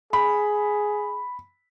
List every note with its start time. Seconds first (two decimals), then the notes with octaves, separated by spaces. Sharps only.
0.13 G#4 B5